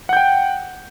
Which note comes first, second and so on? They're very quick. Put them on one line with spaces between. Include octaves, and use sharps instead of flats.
F#5 G6 G5